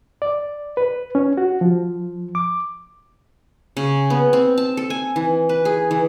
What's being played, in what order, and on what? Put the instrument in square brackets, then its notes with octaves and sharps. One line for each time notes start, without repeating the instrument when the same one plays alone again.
[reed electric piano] D5
B4
C#4
F#4
F3
D6
[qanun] C#3
B3
C4
A5
A4
G#5
E3
B4
G#4
E3